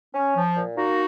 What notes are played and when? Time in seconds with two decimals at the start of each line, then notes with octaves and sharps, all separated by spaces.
0.14 C#4
0.36 F3
0.56 A#2
0.77 A#3 D#4 F#4